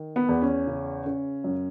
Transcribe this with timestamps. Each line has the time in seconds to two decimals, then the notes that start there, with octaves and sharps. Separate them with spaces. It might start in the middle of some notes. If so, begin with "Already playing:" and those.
Already playing: D#3
0.16 B3
0.29 E2
0.42 C#4
0.67 C#3
1.06 C#3
1.44 F#2